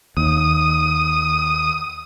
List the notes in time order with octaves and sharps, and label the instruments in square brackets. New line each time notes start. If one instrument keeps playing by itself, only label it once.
[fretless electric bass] D#2 [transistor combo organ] D#6